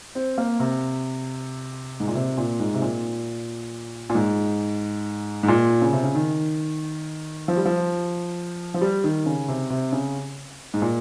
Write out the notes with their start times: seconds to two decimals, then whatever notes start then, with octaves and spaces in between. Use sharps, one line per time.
0.15 C4
0.38 A#3
0.60 C3
2.00 G#2
2.08 A#2
2.15 C3
2.37 A#2
2.60 G#2
2.74 C3
2.82 A#2
4.10 A#2
4.15 G#2
5.43 G#2
5.48 A#2
5.82 C#3
5.93 C3
6.04 C#3
6.15 D#3
7.48 F3
7.57 G3
7.66 F3
8.74 F3
8.81 G3
9.04 D#3
9.26 C#3
9.48 C3
9.70 C3
9.92 C#3
10.74 G#2
10.82 A#2